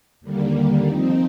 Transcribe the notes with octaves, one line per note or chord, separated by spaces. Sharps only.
D#2 D3 G3 A#3
F3 C4 D#4